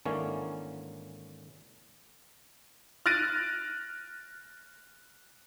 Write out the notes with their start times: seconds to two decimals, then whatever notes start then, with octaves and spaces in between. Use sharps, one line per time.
0.05 G#1 D3 E3 A#3 C#4 C#5
3.06 F6 F#6 A6 A#6 D7 D#7